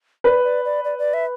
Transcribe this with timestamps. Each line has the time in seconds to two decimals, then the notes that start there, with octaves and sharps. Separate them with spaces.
0.24 B4 D5
0.44 D5
0.65 D5
0.84 D5
0.99 D5
1.14 E5